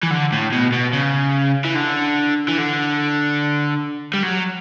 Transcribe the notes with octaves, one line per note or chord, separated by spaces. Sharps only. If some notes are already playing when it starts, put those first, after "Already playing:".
E3
D3
A2
B2
B2
C#3
E3
D3
E3
D3
G3
F#3